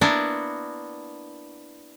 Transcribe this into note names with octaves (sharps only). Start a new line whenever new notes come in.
A#3 B3 D4 E4 F#4